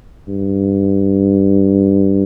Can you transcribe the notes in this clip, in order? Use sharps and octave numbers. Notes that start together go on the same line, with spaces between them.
G2